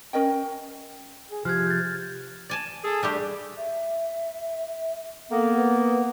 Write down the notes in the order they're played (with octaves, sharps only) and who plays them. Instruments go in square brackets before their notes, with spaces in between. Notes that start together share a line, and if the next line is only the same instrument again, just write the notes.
[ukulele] C#4 A#4 D#5 G5
[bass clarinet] G#4
[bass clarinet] C3 [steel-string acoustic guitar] F3 [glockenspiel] F6 F#6 G#6
[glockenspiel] G6 A6
[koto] D5 G#5 A5
[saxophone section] G#4 A4
[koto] G3 A3 G4 [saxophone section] D4
[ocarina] E5
[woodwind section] A#3 B3 [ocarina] A4
[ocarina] B4